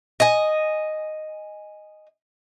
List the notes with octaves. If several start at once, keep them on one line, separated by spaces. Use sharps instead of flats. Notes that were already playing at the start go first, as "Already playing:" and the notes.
D#5 G#5